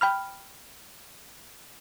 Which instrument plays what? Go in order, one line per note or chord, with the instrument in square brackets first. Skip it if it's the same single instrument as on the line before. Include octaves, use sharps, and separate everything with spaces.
[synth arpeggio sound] G5 B5 F6